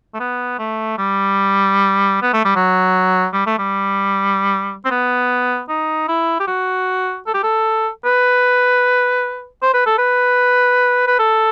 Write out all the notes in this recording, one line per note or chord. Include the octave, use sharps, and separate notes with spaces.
A3
B3
A3
G3
B3
A3
G3
F#3
G3
A3
G3
C4
B3
D#4
E4
G4
F#4
A4
G4
A4
B4
C5
B4
A4
B4
B4
A4